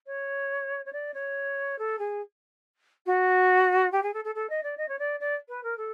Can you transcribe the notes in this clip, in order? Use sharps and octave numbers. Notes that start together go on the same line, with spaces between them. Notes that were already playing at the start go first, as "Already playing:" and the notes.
C#5
C#5
D5
C#5
A4
G#4
F#4
G4
G#4
A4
A4
A4
D#5
D5
D#5
C#5
D5
D5
B4
A#4
A4